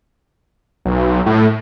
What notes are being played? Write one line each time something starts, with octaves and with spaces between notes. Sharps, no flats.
B1
A2